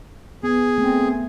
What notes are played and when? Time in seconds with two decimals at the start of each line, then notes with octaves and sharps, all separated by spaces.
0.43 B3 G#4
0.78 A3 C4